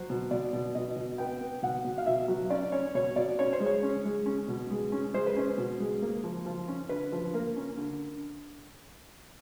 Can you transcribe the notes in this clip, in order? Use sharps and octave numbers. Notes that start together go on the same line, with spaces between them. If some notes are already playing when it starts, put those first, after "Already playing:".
Already playing: F#3 C5
B2
B2 D5
B2
B2 D#5
B2
B3 G5
B3
B2 F#5
B2
F5
B2 E5
F#3
C#4 D5
C#4 C#5
B2 C#5
B2 D5
C#4 C#5
C5
G#3
C#5
C#4
G#3
C#4
B2
G#3
C#4
G#3 C5
B4
C#4 C5
B2
G#3
A#3
F3
F3
C#4
D3 B4
F3
A#3 A#4
C#4
D3